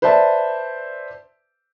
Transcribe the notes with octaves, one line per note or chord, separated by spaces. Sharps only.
B4 C5 D5 E5 A5